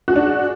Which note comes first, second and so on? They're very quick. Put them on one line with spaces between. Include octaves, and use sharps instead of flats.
F#4 G#4 D4